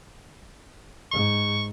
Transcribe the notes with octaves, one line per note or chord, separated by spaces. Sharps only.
G#2 C#6